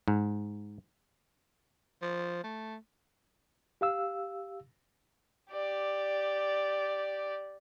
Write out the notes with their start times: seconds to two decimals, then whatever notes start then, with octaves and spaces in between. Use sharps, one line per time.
0.08 G#2
2.02 F3
2.44 A3
3.81 G4 F5 E6
5.52 G4 D5